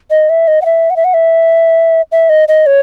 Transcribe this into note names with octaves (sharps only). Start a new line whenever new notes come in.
D#5
E5
D#5
F#5
E5
F#5
E5
F#5
E5
E5
D#5
D#5
C#5